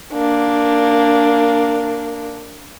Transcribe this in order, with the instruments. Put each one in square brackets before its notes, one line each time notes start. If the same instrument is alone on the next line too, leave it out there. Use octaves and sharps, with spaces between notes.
[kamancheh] A#3 D4